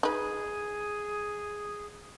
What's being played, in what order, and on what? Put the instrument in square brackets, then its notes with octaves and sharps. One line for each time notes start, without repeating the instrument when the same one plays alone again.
[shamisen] D#4 B4 [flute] G#4